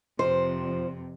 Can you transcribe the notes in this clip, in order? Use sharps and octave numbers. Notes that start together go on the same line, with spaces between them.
F2 C3 F3 C5